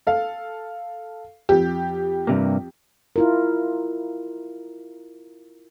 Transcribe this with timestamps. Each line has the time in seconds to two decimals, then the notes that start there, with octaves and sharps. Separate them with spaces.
0.07 A4 F5
1.49 F2 G4
2.27 G2 C3 A#3
3.16 E4 F4 A#4